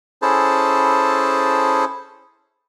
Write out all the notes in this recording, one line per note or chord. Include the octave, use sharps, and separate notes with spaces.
C#4 E4 G#4 A4 C5 A5